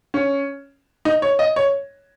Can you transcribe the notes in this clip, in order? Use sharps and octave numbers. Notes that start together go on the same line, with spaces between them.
C#4
D#4
C#5
D#5
C#5